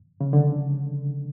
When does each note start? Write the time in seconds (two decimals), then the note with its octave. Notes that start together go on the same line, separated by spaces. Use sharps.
0.21 C#3
0.33 D3